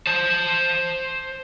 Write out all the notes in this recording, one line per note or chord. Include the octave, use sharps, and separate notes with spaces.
C5 A5